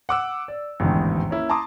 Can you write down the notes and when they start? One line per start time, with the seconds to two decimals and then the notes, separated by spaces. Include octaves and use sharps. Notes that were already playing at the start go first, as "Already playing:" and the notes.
0.09 F#5 D6 E6
0.48 D5
0.80 A1 E2 G#2 D3 D#3
1.30 A#3 C#4 E4
1.50 A5 A#5 C6 D6 D#6